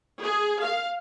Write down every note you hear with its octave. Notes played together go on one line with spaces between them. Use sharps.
G#4
F5